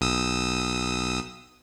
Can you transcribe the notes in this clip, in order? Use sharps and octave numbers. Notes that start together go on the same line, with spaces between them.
B1 D#6 E6